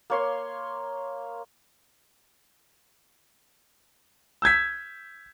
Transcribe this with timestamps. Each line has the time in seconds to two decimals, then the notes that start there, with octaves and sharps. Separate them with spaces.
0.10 A#3 C#5 C6
4.42 E6 G6 G#6 B6